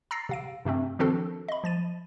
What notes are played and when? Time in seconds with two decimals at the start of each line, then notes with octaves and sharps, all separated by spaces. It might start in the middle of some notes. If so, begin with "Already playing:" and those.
0.11 A#5 E6 A6 A#6 C7
0.29 C3 F5 D7
0.65 G2 C3 A3 C4
0.99 D#3 F3 C4 D4 F#4 A4
1.48 D#5 B5
1.64 F3 A6 D#7